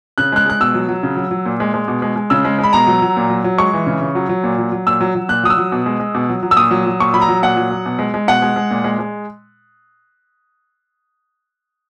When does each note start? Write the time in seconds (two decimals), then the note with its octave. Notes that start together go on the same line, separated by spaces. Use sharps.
0.18 C#3 F#6
0.32 G#3 F#6
0.46 G#3 F#6
0.60 B2 E6
0.74 F#3
0.88 F#3
1.03 C#3
1.17 F#3
1.31 F#3
1.46 A#2
1.60 G#3
1.74 G#3
1.88 B2
2.02 G#3
2.16 G#3
2.30 C#3 E6
2.45 G#3
2.59 G#3 B5
2.73 B2 A#5
2.87 F#3
3.02 F#3
3.17 A#2
3.30 F#3
3.44 F#3
3.58 G#3 C#6
3.73 E3
3.87 C#3
4.01 C#3
4.15 F#3
4.29 F#3
4.44 A#2
4.58 F#3
4.72 F#3
4.87 A#2 E6
5.01 F#3
5.15 F#3
5.29 A#2 F#6
5.43 F#3 D#6
5.50 E6
5.58 F#3
5.72 B2
5.86 G#3
6.00 G#3
6.15 B2
6.29 F#3
6.43 F#3
6.51 E6
6.57 A#2 D#6
6.71 F#3
6.86 F#3
7.00 A#2 C#6
7.14 F#3 B5
7.21 A#5
7.28 F#3
7.43 A#2 F#5
7.57 F#3
7.71 F#3
7.86 B2
7.99 G#3
8.14 G#3
8.28 B2 F#5
8.42 G#3
8.56 G#3
8.71 A#2
8.84 G#3
8.99 G#3